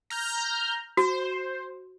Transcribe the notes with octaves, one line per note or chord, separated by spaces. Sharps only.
A#5 F6 G6
F#4 C5